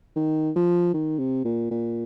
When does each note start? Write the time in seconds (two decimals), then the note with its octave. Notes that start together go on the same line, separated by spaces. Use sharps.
0.16 D#3
0.56 F3
0.94 D#3
1.19 C3
1.45 A#2
1.71 A#2